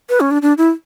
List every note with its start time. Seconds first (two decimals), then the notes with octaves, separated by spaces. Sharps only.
0.10 B4
0.20 C#4
0.31 D4
0.42 D4
0.58 E4